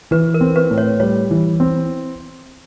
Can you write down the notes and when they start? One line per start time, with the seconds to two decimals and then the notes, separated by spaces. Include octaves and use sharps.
0.11 E3 B4
0.34 A#4
0.41 C4
0.56 B4
0.71 A2
0.78 C#5
1.00 G3 C#5
1.31 E3
1.60 C4